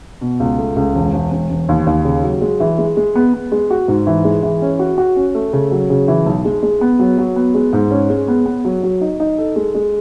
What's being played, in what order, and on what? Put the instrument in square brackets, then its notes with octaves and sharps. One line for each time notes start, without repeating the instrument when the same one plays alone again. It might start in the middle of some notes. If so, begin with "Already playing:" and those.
[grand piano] B2
C#2
A3
C#2
E1
E1
E1
E1
D#2
D#2
C#3
F#3
G#3
E3
G#3
G#3
B3
B3
G#3
F#4
G#2
E3
G#3
E3
C#4
F#4
F#4
C#4
A3
C#3
F#3
C#3
E3
B1
G#3
G#3
B3
F#3
F#3
B3
G#3
G#2
C#4
G#3
B3
B3
F#3
F#3
D#4
D#4
A4
G#3
G#3